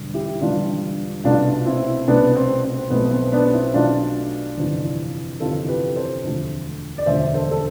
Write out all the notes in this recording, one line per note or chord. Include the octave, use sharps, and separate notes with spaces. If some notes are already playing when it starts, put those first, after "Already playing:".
Already playing: E1 E2 D3 G3
E4 G4
E1 E2 D3 G3 D4 F4
C2 B2 A3 D4 F4
C4 E4
C2 B2 A3 B3 D4
C4
C4
B1 B2 A3 B3
B3
C4
B3 D4
D4
C4 E4
B1 B2 A3 D4 F4
G1 F2 C3 E3
G1 F2 C3 E3 F4 A4
G4 B4
A4 C5
E1 D2 D3 F3 A3
D5
E1 D2 D3 F3 A3 C5 E5
A4 C5
A4